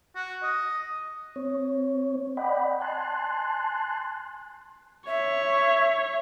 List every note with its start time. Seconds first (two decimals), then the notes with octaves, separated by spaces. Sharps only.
0.16 F#4
0.43 D#5
1.36 C4 C#5
2.37 D5 D#5 F#5 G5 B5
2.81 G#5 A5 C6 F#6
5.07 C#5 E5